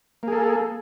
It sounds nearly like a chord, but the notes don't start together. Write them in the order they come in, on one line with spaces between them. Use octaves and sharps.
A#3 G#4 A4